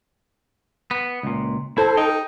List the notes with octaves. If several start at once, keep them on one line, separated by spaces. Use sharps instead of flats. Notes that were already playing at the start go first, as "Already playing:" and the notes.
B3
C#2 A#2
E4 A4 C5
D#4 G5